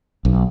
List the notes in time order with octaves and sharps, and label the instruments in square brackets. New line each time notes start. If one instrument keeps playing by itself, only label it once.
[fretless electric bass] B1